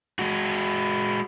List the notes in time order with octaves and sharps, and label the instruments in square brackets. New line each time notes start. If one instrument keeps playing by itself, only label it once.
[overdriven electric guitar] G#3 F#4